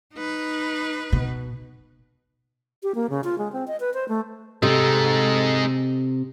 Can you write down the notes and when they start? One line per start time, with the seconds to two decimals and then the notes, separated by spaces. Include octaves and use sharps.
0.15 D#4 B4
1.12 B2
2.83 G4
2.95 A#3
3.10 C#3
3.24 F4
3.38 G#3
3.53 C4
3.67 D#5
3.80 B4
3.94 C5
4.08 A3
4.63 C3 G#3 D#4 A4